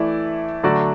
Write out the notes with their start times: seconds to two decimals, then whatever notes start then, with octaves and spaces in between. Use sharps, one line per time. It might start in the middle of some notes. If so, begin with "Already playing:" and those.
Already playing: E3 A3 E4 D5
0.63 D3 F#3 A3 F#4 D5